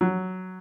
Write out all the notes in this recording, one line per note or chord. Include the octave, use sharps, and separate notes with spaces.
F#3